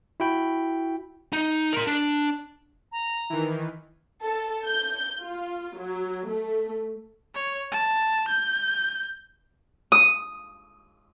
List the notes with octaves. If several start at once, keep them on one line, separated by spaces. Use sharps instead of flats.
E4 F#4 G5 B5
D#4
A#4 C6
D4
A#5
D#3 E3
A4
G6
F4
F#3
A3
C#5
A5
G6
D#6